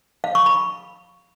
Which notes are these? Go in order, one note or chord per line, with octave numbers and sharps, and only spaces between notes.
F5
C#6
B5